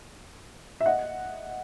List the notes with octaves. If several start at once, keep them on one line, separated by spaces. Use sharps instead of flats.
E5
D#5 F#5